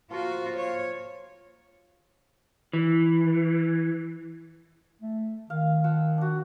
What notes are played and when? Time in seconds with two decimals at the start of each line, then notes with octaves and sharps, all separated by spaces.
0.10 F3 A#3 F4 F#4
0.57 F4 C#5
2.73 E3
5.01 A3
5.50 D#3 F5
5.84 F3 F#5 E6
6.18 D4 F#4